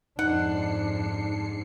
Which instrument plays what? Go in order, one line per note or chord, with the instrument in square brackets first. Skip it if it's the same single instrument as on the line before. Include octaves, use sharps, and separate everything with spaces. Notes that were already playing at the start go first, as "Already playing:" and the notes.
[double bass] F2 D4 [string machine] G#2 C7 C#7 [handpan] D#4 [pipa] F#5